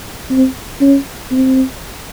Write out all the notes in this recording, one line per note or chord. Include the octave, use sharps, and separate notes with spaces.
C4
C#4
C4